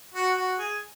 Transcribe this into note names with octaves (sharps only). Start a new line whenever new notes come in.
F#4
F#4
G#4